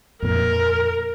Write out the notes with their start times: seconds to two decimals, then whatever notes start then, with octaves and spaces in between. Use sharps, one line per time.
0.22 F2 A#2 A#4